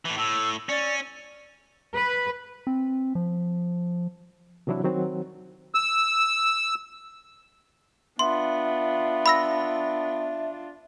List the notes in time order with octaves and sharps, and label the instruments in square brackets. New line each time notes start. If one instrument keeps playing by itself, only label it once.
[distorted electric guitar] A2 E3
[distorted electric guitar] A2 [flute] E6
[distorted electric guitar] C#4 [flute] D5
[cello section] B4
[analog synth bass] C4
F3
[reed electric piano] C3 E3 F#3 D4 E4
D#3 F#3 C4
[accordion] E6
[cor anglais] B3 [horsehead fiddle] D4 F4 [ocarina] E5 [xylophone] C6
[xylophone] B5 E6 A#6